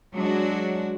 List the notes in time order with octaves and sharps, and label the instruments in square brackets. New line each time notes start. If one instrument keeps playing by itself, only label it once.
[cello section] F#3 G#3 D4 F#4